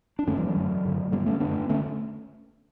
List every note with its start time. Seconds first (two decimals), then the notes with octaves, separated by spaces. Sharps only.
0.19 D4
0.27 F#2 D3 A3 C#4
0.37 E3 G3
0.46 F#3 A3
0.56 F#2 D3
0.85 G2 D3
1.12 G2 D3 G3 B3
1.26 A3 C#4
1.40 F#2 D3 B3 D4
1.69 D3 A3 C#4